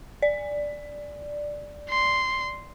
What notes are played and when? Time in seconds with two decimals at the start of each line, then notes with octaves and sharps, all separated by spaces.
0.22 D5
1.89 C6